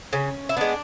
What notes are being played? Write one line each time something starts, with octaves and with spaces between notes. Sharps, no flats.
C#3 C#4
E4
G#3 B3 D4